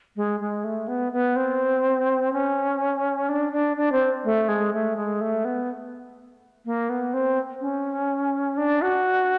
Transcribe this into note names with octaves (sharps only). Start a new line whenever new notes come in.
G#3
G#3
A3
B3
B3
C4
C#4
D4
D4
D4
C4
A3
G#3
A3
G#3
A3
B3
A#3
B3
C4
C#4
D4
F#4